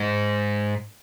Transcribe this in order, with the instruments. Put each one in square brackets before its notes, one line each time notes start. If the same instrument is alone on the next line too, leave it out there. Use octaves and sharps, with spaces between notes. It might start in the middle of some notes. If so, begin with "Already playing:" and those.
Already playing: [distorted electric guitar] G#2